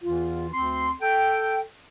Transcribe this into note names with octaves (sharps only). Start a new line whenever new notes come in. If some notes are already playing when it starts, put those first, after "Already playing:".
E2 E3 F4
D2 C4 C6
A4 G5